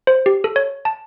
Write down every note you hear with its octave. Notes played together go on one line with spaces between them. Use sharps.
C5
G4
A4
C#5
A5